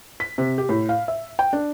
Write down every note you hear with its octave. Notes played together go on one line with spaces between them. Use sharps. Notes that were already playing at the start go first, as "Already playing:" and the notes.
B6
C3
G4
A2
F5
E5
G5
D4